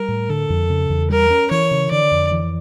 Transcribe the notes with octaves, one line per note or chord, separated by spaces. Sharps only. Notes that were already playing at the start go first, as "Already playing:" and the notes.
Already playing: G3 A#4
A2
D3 A4
F2
C#3
E2
G3 A#4
C#4
E3 C#5
C#3
D3 D5
F2
E3